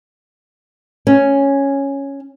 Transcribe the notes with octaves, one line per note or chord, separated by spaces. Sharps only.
C#4